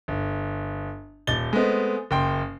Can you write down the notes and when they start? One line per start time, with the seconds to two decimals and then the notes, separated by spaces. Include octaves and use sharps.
0.08 G1
1.27 D#1 A6 G7
1.53 G#3 A3 B3 C4
2.11 F#1 G5 C6